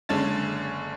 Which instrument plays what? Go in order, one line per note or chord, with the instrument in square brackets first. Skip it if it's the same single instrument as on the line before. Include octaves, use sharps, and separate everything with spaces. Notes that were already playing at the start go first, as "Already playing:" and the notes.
[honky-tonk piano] F#1 D3 G#3 C#4 A5 A6